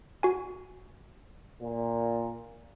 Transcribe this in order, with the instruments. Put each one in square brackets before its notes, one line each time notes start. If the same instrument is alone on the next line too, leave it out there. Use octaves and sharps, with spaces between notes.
[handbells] F#4 G#5
[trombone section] A#2